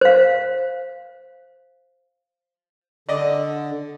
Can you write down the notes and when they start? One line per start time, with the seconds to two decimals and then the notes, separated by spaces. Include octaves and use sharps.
0.01 C5 F5
3.09 D3 D5 D#5